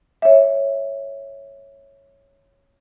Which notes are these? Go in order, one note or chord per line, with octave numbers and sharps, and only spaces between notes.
C#5 E5